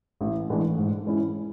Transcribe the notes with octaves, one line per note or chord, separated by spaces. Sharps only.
A1
A2 E3 G#3 D4
G#2
G#3 C#4 E4